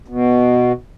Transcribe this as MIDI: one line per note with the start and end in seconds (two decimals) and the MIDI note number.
0.08 0.72 47